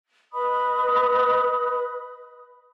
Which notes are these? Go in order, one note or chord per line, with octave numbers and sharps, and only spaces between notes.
B4 D#5 B5 D#6